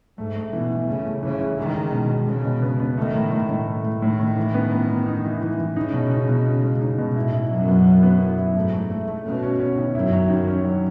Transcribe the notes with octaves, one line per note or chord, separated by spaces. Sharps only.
G#2 A3
A3
B2 E3
E3
C#3 A3
A3
C#3 E3
E3
D#3 G#3
G#3
B2
G#3
C#3 G#3
B2
B3
B3
D#3 A3
A2
A2
A2
A3
A3
A2 D#3
A2
E3
B3
B3
B3
D#4
E3
E3
E3
C#3 D#4
B2
D#4
B2
D#4
G#3
D#4
B2
A2 E4
E4
F#2 F#3
B3
E4
B3
E4
E4
G#2 A3
A3
A3
A3
B2 C#4
C#4
C#4
D#3
F#2 E4
F#3
F#2 D#3
C#4
F#3